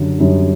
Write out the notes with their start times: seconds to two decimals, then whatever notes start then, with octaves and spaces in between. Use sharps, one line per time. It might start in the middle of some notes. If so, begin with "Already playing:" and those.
Already playing: F#2 D3 G3
0.18 F#2 D3 G3